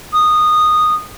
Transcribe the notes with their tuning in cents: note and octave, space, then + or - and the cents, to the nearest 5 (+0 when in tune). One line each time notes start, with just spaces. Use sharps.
D#6 -15